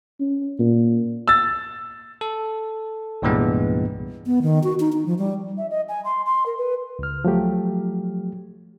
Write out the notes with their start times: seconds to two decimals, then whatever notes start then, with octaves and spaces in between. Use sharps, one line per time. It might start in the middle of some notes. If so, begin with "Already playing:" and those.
0.21 C#4
0.60 A#2
1.28 E6 A6
2.21 A4
3.22 C2 G2 A#2 E3 G#3 B3
4.26 B3
4.42 D#3
4.64 F#4
4.80 D#4
4.93 D#4
5.06 F3
5.19 G3
5.58 E5
5.70 D#5
5.89 G#5
6.05 C6
6.26 C6
6.46 A#4
6.58 B4
6.99 C#2 F6
7.25 F3 F#3 A3 G4